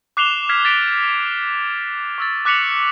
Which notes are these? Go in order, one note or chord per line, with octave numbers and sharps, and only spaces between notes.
D6 F#6 C7 E7 F7 G7
F6 G#6 B6 C7
A6 B6 D7
C#6 E6 A6
D6 F#6 B6 C#7 F7 F#7